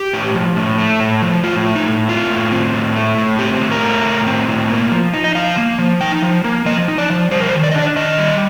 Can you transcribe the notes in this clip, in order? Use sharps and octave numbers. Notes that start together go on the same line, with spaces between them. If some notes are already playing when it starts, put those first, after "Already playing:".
Already playing: G4
A2
F3
A2
A3
A2
F3
A2 F4
A3
D#4
A2
A3 F4
A2
C4
A2
A3
A2
C4 G4
A2
A#4
A3
A2
C4
A2
A#3
F3
D#4
D#5
F3 F5
A#3
F3
D#4 G5
F3
A#3
F3 D#5
D#4
D5
F3
G3 C5
A#4
C5
D#3
D5
D#5
D4 D5
D#3 D#5
G3